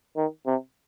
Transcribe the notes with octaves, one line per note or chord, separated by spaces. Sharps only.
D#3
C3